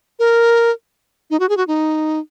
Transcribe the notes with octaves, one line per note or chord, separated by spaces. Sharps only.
A#4
D#4
F#4
G#4
F#4
D#4